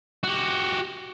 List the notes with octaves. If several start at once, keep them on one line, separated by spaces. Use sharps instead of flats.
F#4 G4